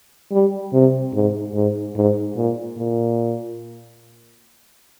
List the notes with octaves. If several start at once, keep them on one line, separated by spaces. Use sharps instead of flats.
G3
C3
G#2
G#2
G#2
A#2
A#2